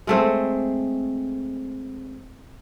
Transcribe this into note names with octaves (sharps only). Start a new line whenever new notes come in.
G#3 A3 C4